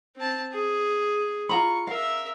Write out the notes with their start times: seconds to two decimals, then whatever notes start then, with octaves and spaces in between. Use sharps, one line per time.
0.16 C4 A5
0.52 G#4
1.49 F4 A#5 B5 C#6
1.87 A#4 E5 F5